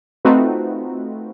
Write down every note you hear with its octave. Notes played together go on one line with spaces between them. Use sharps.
A3 C4 D#4 F4 F#4 B4